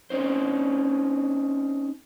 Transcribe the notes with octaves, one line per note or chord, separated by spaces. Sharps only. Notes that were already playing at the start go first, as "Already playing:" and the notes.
C4 C#4 D#4 C5